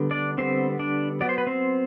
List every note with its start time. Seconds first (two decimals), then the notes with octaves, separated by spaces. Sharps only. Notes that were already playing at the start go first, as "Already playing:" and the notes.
Already playing: D3 G3 B3
0.11 D4 D5
0.38 D3 G3 B3 C4 C5
0.79 D4 D5
1.21 F#3 B3 D5
1.29 C5
1.38 B4
1.47 C4 C5